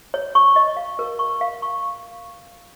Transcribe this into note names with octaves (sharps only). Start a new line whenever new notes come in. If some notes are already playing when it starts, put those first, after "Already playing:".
C#5
C#6
D#5
F5
A#4
C#6
F5
C#6